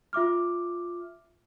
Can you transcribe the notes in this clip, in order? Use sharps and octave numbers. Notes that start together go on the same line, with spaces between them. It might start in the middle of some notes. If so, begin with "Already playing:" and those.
F4 E5 D6 F6